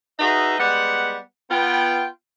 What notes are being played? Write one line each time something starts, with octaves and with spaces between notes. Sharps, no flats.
D#4 F#4 G#4 B4 E5
G3 G#3 B3 F#5
B3 F4 G5